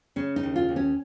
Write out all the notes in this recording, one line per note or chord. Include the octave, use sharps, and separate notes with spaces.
C#3 C#4
D#4
D#2
F4
D#2
C#4